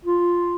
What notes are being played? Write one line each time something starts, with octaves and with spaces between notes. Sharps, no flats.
F4